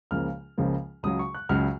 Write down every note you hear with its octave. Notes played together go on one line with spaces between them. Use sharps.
C#2 C#3 F3 A#3 F6
C#2 C#3 F3 A#3
C#2 C#3 F#3 D#6
C#6
F#6
C#2 C#3 F#3 F6